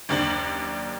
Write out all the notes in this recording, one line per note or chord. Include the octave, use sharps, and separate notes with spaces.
F#1 D#2 D4 F#7